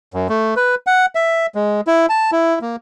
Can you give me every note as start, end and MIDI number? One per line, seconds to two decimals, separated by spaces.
0.14 0.28 42
0.29 0.54 57
0.56 0.75 71
0.87 1.06 78
1.15 1.46 76
1.55 1.81 56
1.87 2.06 64
2.09 2.31 81
2.32 2.59 64
2.61 2.76 58